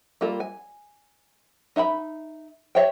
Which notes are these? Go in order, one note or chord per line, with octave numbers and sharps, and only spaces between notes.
G3 A#3 F4 A4
G#5
D#4 E5 A5 B5
G4 C#5 E5 F5 G5